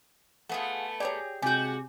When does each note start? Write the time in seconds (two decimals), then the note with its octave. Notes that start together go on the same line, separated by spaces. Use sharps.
0.49 A3 B3 F4 G#4 F#5
1.00 G4 G#4 C#5 D5 A#5
1.42 C3 G#3 F#4 G4 G#5 G6